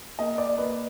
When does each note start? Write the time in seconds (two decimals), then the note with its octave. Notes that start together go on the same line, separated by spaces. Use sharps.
0.19 A#3 D#5
0.38 D5
0.58 A#3 B4